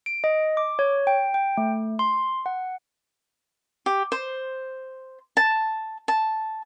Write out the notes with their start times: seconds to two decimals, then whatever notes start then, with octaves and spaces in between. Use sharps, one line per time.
0.06 D7
0.24 D#5
0.57 D6
0.79 C#5
1.07 G5
1.34 G5
1.57 A3
1.99 C6
2.46 F#5
3.86 G4
4.12 C5
5.37 A5
6.08 A5